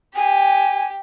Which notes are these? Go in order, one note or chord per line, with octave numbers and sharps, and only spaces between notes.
G4 G#5